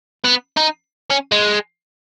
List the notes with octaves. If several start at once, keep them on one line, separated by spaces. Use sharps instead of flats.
B3
D#4
C#4
G#3